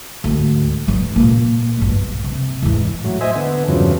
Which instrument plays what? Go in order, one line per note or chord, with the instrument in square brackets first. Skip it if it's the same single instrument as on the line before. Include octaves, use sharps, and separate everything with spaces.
[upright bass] D2 G#2
G2 F#3
A#2 A#3
B1 G2
C3
E2 G#2
[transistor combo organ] A2 F#3
C5 D#5 E5 G#5
D3 B3
E2 G2 C#3 F3 F#3